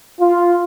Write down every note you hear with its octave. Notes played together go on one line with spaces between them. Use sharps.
F4